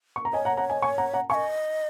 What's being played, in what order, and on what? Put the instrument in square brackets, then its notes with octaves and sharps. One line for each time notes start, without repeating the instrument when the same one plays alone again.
[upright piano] C#6
A#5
[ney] C#5 [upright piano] D#5 G#5
[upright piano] F#5 A#5
F#5 A#5
D#5 G#5
G#5 C#6
F#5 A#5
F#5 A#5
[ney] D#5 F5 [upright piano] G#5 C#6